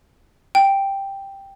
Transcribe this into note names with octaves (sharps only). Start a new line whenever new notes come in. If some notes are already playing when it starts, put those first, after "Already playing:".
G5